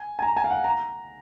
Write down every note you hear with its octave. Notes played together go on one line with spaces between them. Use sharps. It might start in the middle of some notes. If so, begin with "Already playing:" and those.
Already playing: G#5
G#5
A#5
G#5
F5
F#5
A#5